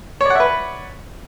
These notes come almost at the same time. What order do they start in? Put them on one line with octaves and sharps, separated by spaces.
C#5 D5 F#5 E5 B4